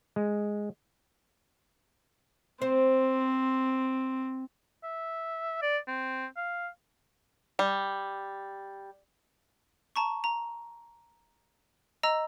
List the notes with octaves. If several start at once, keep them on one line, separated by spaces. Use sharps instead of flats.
G#3
C4 C5
E5
D5
C4
F5
G3
A5 A#5 C#6
A#5
D#5 A#5 E6